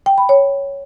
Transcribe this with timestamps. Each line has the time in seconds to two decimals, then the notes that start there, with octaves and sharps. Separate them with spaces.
0.06 G5
0.18 B5
0.29 C#5